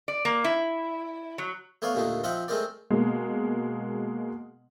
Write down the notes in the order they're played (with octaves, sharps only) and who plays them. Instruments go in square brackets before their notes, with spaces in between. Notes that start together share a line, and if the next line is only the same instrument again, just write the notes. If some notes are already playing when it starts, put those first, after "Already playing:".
[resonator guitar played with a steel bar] D5
A#3
E4
F#3
[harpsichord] A3 B3 C#5 D5 F5
D#2 A#2 D3 A3 D#4
F3 C4 D#4 F4 E5 F#5
G#3 A3 C4 D#4 A#4 D5
[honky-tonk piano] B2 G#3 A#3